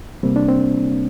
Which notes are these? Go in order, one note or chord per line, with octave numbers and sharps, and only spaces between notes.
C3 G3 A#3 C4
D4
C4